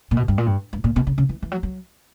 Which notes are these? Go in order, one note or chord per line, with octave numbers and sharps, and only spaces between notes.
A#2
B2
G2
A#2
G2
G2
A#2
B2
C#3
C#3
E3
E3
F#3
F#3